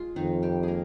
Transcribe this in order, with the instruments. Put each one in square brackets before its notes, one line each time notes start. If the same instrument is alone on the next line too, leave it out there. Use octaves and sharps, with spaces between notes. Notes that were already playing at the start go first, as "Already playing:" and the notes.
Already playing: [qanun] G#3 F4
[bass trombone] F2 [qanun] D#3 D#4
[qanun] G3 G4
A#3 G#4 A#4